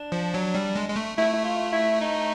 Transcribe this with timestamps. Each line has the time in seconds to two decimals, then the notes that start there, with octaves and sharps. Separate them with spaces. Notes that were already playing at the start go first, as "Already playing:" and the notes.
Already playing: D4
0.12 F3
0.34 F#3
0.55 G3
0.76 G#3
0.89 G#3
0.96 A3
1.17 A3 E4
1.33 E4
1.45 F4
1.73 E4
2.01 D#4